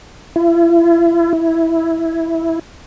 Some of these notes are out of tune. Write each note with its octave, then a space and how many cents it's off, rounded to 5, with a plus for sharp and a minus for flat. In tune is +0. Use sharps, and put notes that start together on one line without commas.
E4 +40
E4 -5